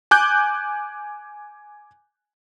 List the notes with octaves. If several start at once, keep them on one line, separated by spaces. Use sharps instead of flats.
G#5 D6 F#6 G6